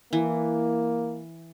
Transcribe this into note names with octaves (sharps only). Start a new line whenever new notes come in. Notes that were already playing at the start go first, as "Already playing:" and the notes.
E3 A#3